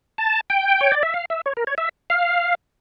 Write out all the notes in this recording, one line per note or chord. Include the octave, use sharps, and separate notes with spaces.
A5
G5
C#5
D5
E5
F5
E5
C#5
A#4
C#5
E5
F5